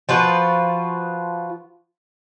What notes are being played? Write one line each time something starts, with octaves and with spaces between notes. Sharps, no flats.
F3 F4 F#4 B4